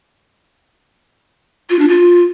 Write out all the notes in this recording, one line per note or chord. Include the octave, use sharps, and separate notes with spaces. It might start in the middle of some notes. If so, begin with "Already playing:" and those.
F4
D4
F4